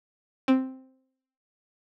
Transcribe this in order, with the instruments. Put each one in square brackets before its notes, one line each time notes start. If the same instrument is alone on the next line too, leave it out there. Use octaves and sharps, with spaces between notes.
[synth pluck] C4